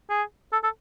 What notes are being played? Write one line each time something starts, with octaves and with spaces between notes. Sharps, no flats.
G#4
A4
A4